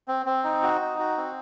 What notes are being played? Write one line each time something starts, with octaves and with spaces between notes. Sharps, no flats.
C4
C4
D#4
F#4
D#4
F#4
C4